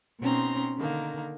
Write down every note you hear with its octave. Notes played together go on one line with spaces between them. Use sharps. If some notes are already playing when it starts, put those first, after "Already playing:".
B2 C4 C#4 D#4 A#5 C6
D3 D#3 A#3